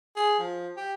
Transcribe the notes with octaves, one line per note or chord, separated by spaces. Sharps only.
G#4
F3
G4